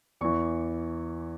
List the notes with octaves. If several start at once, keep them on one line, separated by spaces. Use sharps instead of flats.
E2 E3 C#6